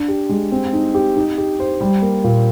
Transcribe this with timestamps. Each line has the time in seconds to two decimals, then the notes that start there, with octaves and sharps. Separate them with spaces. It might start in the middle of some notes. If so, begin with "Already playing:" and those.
Already playing: D4
0.08 G4
0.30 G#3
0.52 C4
0.73 D#4
0.95 G4
1.17 D#4
1.38 G4
1.60 C5
1.81 G3
2.02 A#3
2.24 A#2